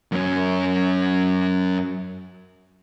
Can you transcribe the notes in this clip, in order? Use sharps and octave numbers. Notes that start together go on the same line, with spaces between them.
F#2 C#4